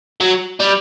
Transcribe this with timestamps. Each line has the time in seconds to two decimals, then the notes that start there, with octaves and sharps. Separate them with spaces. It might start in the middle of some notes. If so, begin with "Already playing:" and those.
0.20 F#3
0.60 G3